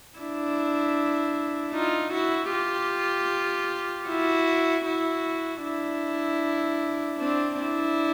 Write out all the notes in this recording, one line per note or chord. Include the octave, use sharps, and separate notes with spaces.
D4 E4
D#4 F4
E4 F#4
F4 G4
E4 F#4
E4 F#4
D4 E4
C4 D4
D4 E4